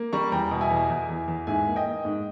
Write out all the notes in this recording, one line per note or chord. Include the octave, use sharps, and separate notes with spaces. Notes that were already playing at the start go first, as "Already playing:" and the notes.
Already playing: A#3
G3 A#5 C#6
E2 G5 A#5
B2
E5 G#5
E2
E2
E2
E2
G#2 E5 G#5
A#3
D#5 G5
A#3
G#2